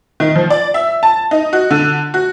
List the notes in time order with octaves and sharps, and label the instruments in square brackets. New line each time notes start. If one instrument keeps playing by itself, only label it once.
[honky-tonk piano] D#3
F3
D5
E5
A5
D#4
F#4
D3
F#4